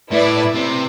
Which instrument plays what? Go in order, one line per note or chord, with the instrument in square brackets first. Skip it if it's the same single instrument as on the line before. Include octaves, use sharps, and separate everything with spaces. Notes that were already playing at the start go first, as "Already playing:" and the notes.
[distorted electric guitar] A2 [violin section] E4 B4 D5
[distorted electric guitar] C3